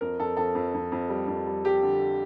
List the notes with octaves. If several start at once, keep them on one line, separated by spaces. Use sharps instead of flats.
F2 A#4
F2 A4
F2 A4
F2
F2
F2
G3
F2
G3
G3 G4
D3